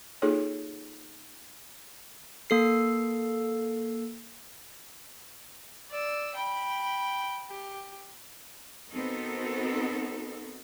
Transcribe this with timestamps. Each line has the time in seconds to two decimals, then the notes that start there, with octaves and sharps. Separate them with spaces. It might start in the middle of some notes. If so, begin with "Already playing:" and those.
0.22 A#3 D#4 F4 G#4 A4 C#5
2.50 A#3 A4 C7
5.90 D5 E6
6.35 G5 B5
7.50 G4
8.91 B3 C4 D#4 F#4 A4 A#4